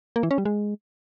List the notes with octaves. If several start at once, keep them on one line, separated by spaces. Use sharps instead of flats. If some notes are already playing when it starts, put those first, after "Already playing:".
A#3
E3
C#4
G3
G#3